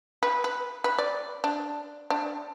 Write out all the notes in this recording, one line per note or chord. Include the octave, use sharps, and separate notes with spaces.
B4
B4
B4
D5
D4
D4